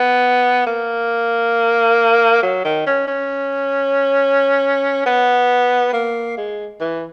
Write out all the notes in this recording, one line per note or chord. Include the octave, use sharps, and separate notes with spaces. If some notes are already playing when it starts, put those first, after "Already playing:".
Already playing: B3
A#3
F#3
D#3
C#4
C#4
B3
A#3
G#3
E3